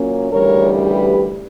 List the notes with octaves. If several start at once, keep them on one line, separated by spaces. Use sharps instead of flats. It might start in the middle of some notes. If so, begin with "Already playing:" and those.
Already playing: A#2 F#3 A#3 C#4
D2 C#3 E3 G3 A#4 C#5
G4 B4